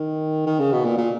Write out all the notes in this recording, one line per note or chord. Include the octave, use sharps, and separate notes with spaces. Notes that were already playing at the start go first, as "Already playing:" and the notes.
Already playing: D#3
D#3
C#3
B2
A#2
A#2